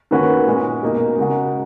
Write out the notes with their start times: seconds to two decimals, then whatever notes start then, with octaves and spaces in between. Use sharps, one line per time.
0.11 D#3 A#3 C#4 F#4 B4
0.47 A#2 G#3 C#4
0.83 B2 A#3 D#4 A#4
1.18 C#3 G#3 D#4 F#4 A#4